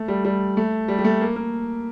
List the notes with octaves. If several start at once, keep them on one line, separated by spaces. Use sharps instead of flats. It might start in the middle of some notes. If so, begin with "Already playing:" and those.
Already playing: A3
G3
G3
A3
G3
G3
A3
A#3
A#3